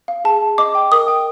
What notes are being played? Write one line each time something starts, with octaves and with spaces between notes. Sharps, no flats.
F5
G#4 A5
G#4
D#5 D6
G5
A#4 D#6
G5